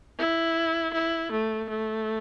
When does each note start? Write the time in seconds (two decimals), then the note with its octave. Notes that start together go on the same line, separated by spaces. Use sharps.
0.18 E4
0.93 E4
1.31 A3
1.69 A3